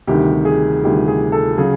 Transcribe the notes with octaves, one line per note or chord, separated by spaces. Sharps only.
D2 C3 D#3 G3 G4
G#4
D2 C3 D#3 G3 G4
G#4
A4
C#3 F#3 G#4